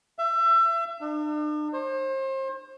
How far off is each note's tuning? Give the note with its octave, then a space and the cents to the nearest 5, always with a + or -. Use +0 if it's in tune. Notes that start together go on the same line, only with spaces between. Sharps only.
E5 +30
D4 +45
C5 +35